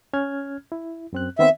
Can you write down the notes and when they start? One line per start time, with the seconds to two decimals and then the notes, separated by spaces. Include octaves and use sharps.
0.13 C#4 F6 G#6
0.72 E4
1.13 F#2 C4 F#6
1.39 D#3 B3 C4 E5